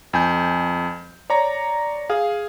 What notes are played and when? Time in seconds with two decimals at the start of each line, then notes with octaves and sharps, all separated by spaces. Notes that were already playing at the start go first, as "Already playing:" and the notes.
0.13 F2 G#5 G6
1.30 C#5 D5 A#5
2.10 G#4 F5